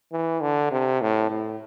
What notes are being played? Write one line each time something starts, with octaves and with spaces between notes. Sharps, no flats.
E3
D3
C3
A2
A2